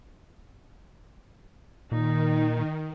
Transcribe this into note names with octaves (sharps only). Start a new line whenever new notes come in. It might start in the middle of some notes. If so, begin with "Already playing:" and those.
A#2 D#3 D#4